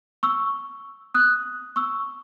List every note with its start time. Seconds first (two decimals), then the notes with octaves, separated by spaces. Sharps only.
0.23 C#6 E6
1.14 D#6 F#6
1.76 C#6 E6